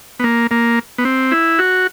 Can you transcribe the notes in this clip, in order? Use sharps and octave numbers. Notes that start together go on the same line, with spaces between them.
B3
A#3
A#3
B3
C4
E4
F#4